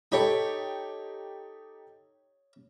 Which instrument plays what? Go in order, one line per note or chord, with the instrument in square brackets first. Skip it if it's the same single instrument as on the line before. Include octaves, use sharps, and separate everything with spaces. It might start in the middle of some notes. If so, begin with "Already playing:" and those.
[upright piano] D#4 G4 A4 [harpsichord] C#5 B5